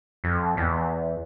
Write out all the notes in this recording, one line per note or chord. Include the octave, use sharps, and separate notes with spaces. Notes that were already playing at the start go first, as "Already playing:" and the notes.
F2
E2